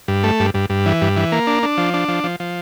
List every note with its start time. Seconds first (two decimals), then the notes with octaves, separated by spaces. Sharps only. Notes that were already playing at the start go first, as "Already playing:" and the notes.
0.08 G2
0.23 A3
0.40 G2
0.54 G2
0.70 G2
0.86 E3
1.02 G2
1.16 E3
1.32 A#3
1.47 D4
1.63 D4
1.78 F3
1.94 D4
2.08 F3
2.24 F3
2.40 F3